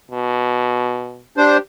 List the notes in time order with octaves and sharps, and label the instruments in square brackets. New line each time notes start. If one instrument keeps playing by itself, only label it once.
[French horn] B2
[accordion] D4 C5 [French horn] G4